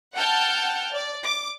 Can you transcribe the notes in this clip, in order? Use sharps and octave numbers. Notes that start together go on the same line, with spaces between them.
F#5 G5 A5 F6 G6
D5
D6